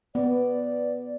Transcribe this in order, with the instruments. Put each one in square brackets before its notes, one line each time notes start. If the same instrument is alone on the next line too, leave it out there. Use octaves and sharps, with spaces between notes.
[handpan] B3 [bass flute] D5